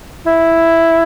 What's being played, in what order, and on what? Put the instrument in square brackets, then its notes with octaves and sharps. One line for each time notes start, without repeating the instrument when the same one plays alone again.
[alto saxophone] E4